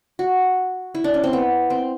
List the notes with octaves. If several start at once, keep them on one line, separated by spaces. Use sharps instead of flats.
F#4
E4
D4
C#4
C4
B3
C4